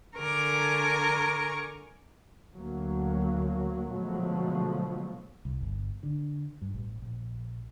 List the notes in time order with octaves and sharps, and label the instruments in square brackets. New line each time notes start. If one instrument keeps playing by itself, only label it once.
[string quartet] D3 A#4 G#5 A#5 C#6 D6
[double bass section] D2 F#3 A#3
B2 D3 F3 F#3 G#3 A3
[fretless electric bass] C2
G1
D3
G2
A1
A#1